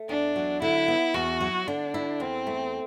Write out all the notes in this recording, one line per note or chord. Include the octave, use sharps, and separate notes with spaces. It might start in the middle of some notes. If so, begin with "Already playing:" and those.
Already playing: A3
E2 D4
F#3
D3 E4
B3
E2 F#4
F#3
D3 D4
E4
E2 C4
A3